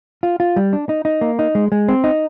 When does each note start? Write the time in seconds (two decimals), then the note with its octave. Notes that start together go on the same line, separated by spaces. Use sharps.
0.23 F4
0.40 F4
0.56 G3
0.73 D4
0.89 D#4
1.05 D#4
1.21 A#3
1.39 D#4
1.55 G#3
1.72 G#3
1.88 C4
2.04 D#4